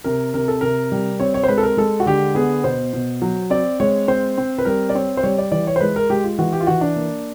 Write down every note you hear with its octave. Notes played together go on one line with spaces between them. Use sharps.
C3 A#4
C3 A#4
A4
C3 A#4
G3
C4 C#5
C#5
C5
G#3 B4
A4
A#4
G#3 A4
F#4
D3 G4
B3 G#4
B2 C5
B2
F#3
C4 D5
G#3 C#5
C4 C5
C4
B4
G3 A#4
D5
C4 C#5
C5
G3 C#5
D5
E3 D5
C#5
C5
G#3 B4
A#4
G#3 G4
F4
E3 F#4
G4
F4
E3 F#4
D4
A#3